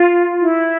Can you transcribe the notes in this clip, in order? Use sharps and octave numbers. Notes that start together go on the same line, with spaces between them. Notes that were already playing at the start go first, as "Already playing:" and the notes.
Already playing: F4
E4